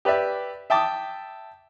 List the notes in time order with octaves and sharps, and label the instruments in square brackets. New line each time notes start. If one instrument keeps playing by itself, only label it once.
[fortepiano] G4 B4 D5 E5
E5 G5 A5 D6 D#6